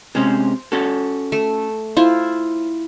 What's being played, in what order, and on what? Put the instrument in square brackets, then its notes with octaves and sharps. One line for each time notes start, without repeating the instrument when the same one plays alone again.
[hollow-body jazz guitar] C3 G#3 C#4 [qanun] C5
[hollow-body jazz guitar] C#4 F#4 A4
[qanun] A3
[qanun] E4 F4 [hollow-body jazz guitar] C5